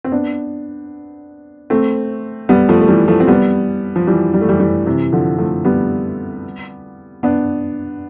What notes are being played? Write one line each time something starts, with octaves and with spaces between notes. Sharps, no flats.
C4
B3 D4
A3 C4
G3 B3
F3 A3
A3
E3 G3
F3 A3
C4
G3 B3
F3
E3 G3
G3
A3
E3 G3
E3 G3
C3 E3
D3 F3
F3 A3
G3 B3
B3 D4